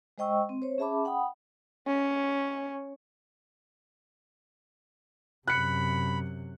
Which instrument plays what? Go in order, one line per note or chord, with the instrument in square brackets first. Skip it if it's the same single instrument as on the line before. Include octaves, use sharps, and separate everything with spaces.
[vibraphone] G#3 C5 D#5 G5 C#6 E6
C4
C5 C#5
C#4 G#4 E5 A5 B5 D6
F#5 G5 B5 D#6
[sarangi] C#4
[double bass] F#2 C3 [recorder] B5 [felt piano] F#6 C#7